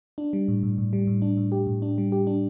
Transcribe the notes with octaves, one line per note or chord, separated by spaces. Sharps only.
D4
G3
A2
A2
A2
G3
A2
D4
A2
G4
A2
D4
G3
G4
D4